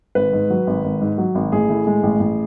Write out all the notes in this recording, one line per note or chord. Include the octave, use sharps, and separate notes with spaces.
G#1 B4
G#2
F#3
G#1
G#1
G#2
F#3
G#1
A1 G#4
A2
G#3
A1
A1